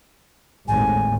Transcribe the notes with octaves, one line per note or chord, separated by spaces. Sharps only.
G#1 D#2 A2 G#5